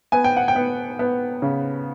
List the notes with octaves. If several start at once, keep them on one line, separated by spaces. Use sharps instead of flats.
B3 G#5
G5
F#5
G5
B3
B3
C#3